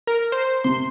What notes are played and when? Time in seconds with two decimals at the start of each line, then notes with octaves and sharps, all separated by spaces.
0.07 A#4
0.32 C5
0.64 C3 C6